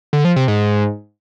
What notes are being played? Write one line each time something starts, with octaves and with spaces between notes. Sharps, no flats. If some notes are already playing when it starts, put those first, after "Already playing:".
D3
F3
C3
G#2